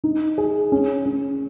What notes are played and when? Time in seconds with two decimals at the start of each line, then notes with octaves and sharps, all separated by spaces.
0.04 D#4
0.38 G#4
0.72 C#4
1.06 C#4